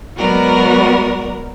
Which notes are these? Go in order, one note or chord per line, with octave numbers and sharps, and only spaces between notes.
F#3 G#3 B3 F#4 A#4 D5